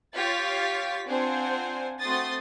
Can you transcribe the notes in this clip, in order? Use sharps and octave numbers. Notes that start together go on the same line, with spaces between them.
F4 G4 C#5 F5 A6 B6
C4 D4 F4 C5 F#5 G#5
A3 C4 F#4 C6 D#6 A6